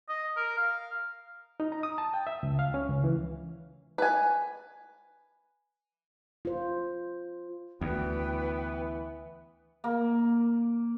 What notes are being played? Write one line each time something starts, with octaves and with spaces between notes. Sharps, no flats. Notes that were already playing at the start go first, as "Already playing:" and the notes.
D#5
A#4
F5
D#4
A#5
D#6
A5
G5
E5
C#2
F5
C#4
C#2
E3
B4 G#5
F4 C5
D2 E3 B3 B4 G5
A#3